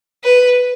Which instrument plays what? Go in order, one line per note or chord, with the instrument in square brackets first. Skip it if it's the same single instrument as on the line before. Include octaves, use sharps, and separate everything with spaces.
[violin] B4